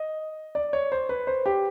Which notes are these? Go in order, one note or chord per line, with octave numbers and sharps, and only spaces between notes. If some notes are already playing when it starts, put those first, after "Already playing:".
Already playing: D#5
D5
C#5
C5
B4
C5
G4